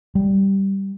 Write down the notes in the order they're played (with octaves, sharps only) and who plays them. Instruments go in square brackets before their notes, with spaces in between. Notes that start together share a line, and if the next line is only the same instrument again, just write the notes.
[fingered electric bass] G3